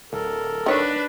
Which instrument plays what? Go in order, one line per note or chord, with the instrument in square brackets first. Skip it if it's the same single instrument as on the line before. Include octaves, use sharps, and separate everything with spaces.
[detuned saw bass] D1 [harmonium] A4 A#4
[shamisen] D#3 C#5 [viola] D4 B4